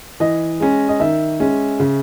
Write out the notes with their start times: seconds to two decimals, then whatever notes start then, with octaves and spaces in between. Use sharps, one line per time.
0.20 E3 D#5
0.60 G#3 C#4
0.89 D#5
1.00 D#3 E5
1.40 G#3 C#4
1.80 C#3